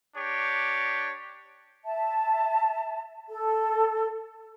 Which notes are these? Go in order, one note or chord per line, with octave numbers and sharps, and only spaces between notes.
D4 G4 C#5
E5 A5
A4